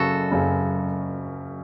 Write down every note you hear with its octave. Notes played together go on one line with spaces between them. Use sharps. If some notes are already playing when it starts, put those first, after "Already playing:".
Already playing: F#1 F#2 C#3 F#4 A4
F#1 F#2 C#3